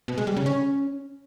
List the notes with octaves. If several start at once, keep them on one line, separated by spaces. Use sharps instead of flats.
B2
G#3
G3
C#3
C#4